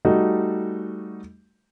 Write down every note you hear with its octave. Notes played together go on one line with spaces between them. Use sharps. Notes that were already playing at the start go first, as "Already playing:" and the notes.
G3 A3 D#4 F#4